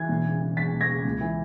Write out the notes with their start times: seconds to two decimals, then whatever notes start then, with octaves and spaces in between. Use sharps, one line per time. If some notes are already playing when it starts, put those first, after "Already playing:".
Already playing: E3 G#6
0.09 E1
0.25 C#3
0.41 E3
0.57 E2 A6 B6
0.73 E1
0.81 G#6 A#6
0.89 C#3
1.05 C#2
1.21 E3